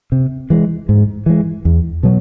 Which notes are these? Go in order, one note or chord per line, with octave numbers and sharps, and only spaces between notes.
C3
E3 G#3
G#2
E3 G#3
E2
B2 F#3